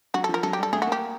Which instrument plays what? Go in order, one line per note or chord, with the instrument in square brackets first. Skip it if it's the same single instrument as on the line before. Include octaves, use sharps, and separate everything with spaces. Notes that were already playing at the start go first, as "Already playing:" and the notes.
[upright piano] F#3 [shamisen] F#4
[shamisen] A4
[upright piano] F3
[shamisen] A#4
[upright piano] F#3 [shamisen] A4
[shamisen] G4
[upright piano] G3 [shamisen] A4
[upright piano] A3 [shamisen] G#4
[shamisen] F#4
[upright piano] A#3
[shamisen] G4